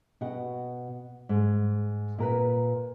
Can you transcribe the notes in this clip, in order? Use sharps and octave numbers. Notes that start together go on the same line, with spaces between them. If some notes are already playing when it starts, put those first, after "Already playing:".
B2 F#4 F#5
G#2
A#2 A#4 B4